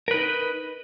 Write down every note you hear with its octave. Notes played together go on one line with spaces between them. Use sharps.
D#4 A#4 B4